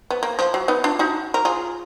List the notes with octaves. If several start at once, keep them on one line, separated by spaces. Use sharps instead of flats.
B3
A#3
F3
F#3
B3 D#4
D4 F4
D#4 F#4
A#4
F4 G#4